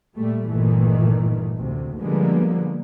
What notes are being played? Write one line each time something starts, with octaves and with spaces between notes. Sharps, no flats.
A#2 G3 A3
G1 A#2 D#3 E3 A3
D2 C3
D3 F3 G3 G#3 A#3 B3